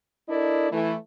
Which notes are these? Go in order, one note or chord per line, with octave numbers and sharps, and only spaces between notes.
D4 E4 A4 A#4 D5 D#5
E3 A3 E4